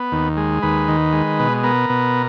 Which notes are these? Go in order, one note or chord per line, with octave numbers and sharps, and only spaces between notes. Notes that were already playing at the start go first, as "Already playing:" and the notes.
Already playing: B3
D#2
G#3
D#2 B4
D#3
G#3
B2
B3 A#4
B2